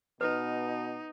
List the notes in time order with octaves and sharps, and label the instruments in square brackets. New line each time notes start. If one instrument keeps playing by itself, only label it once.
[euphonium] B2 [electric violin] D#4 [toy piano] B4